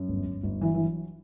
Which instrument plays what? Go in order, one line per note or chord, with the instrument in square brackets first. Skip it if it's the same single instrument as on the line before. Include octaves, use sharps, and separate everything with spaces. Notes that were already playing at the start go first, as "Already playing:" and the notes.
Already playing: [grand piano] F#2
G1
G1
G1
[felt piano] E3 [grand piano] F#3
[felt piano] E3